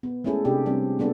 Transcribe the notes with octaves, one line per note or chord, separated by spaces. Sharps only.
B3
G#3 A3 C#4 E4 G#4 A4
C3 D4 G4
G3 C4 D4
G#3 B3 D4 A4